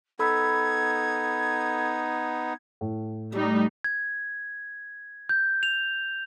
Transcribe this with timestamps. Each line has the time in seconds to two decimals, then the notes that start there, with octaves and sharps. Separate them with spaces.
0.19 B3 D#4 A4 B5 E6 G#6
2.81 A2
3.32 G3 A3 C#4 D#4
3.84 G#6
5.29 G6
5.63 F7